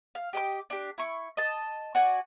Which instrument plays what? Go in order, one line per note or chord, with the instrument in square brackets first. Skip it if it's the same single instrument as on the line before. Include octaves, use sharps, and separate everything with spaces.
[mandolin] F5
G4 D#5 G5 D6
D4 G4
E4 C#6
D#5 A5
F#4 D5 G#5